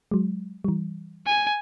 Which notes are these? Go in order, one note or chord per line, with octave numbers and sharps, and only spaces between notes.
F#3 G#3
E3 G3
G#5